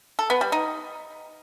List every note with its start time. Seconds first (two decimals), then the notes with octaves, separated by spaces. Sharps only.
0.19 A4
0.30 B3
0.41 G3
0.52 D#4